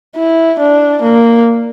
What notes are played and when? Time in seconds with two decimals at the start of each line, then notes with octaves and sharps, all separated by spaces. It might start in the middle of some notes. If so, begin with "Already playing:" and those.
0.16 E4
0.60 D4
1.03 A#3